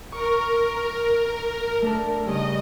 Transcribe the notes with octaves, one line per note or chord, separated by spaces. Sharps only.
A#4 C#6
A3 D4 A4
G2 C#3 D#4 D#5